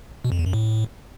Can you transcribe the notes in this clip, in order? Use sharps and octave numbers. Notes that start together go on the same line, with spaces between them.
B2
F2
E2
F#2
A2